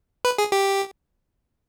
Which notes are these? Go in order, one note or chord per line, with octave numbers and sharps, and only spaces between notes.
B4
G#4
G4